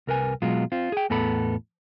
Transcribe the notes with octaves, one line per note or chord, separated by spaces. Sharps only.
C2 A#4 B4 G#5
B2 F#3 G#3 F4
C4 F4
G#4 G5
E2 A2 B3 A4 B5